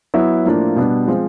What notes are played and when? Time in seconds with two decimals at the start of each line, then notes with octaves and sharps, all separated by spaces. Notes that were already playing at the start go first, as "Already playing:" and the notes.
0.14 F#3 B3 E4
0.45 A2 F3 A#3 D4 F4
0.76 B2 G3 B3 D4
1.08 F3 G#3 C4